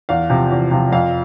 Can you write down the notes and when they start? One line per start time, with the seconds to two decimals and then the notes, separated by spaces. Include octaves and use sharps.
0.09 E2 F5
0.30 C3 F3
0.51 E2
0.71 C3 F3
0.92 F2 F5